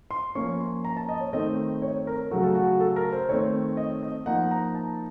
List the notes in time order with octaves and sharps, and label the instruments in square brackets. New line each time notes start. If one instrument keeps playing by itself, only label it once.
[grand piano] C6
F3 A#3 C#4 C#6
C6
A#5
A5
D#5
C#5
D#3 A3 C4 D#4 D#5
C#5
A#4
C#3 F#3 A3 F#4
A4
F#4
A4
A#4
C5
D#3 A3 C4 C#5
D#5
D#5
F3 A#3 D#4 F#5
A#5
A5